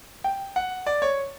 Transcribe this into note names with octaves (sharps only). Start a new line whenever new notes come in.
G5
F#5
D5
C#5